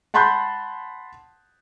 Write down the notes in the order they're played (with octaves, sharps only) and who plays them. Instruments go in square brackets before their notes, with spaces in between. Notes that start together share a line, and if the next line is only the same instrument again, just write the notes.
[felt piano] F#5 A5 B5 C6 F#6 G6